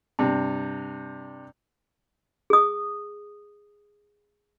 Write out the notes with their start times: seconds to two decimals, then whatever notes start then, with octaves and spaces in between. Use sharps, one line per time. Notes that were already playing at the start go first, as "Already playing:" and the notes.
0.19 G2 C3
2.50 G#4 D#6